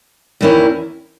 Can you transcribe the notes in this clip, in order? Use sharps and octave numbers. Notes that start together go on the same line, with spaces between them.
E2 D#3 A#3 C#4 E4